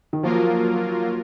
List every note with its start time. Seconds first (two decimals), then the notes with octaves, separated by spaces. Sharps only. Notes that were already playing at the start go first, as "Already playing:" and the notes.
0.13 D#3
0.23 F3 F#3 A#3 F4 A#4